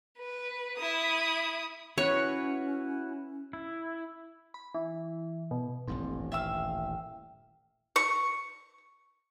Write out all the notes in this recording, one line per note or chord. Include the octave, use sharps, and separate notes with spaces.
B4
E4 D#6
C#4 E4 F#4 B4 C#5
E4
B5
E3
B2
D#1 A1 G2 C4
E5 F5 G5 E6
C#6